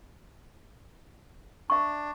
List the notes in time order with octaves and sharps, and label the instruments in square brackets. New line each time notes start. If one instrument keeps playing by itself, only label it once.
[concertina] D4 [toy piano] E5 C#6